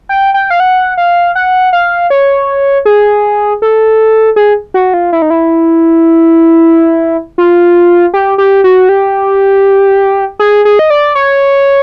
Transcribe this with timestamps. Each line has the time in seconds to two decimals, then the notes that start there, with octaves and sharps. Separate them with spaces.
0.09 G5
0.34 G5
0.50 F5
0.60 F#5
0.97 F5
1.35 F#5
1.73 F5
2.10 C#5
2.85 G#4
3.62 A4
4.36 G#4
4.74 F#4
4.94 F4
5.13 E4
5.22 D#4
5.30 E4
7.38 F4
8.14 G4
8.38 G4
8.64 F#4
8.89 G4
10.39 G#4
10.65 G#4
10.79 D#5
10.90 D5
11.15 C#5